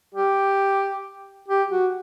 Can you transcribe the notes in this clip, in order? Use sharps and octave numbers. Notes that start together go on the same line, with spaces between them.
G4
G4
F#4